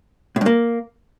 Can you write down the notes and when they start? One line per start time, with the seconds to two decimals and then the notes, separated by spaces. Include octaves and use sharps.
0.36 A2
0.41 G2
0.46 A#3